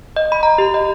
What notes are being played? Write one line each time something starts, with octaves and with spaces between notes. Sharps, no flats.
D#5
B5
A#5
G4
D#5